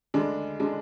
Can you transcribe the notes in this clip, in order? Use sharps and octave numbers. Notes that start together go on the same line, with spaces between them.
D2 D3 G#3 D4
D3 G#3 D4